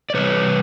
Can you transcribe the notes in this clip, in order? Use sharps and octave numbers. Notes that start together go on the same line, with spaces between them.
D5
C3 E3 G3 B4 C#5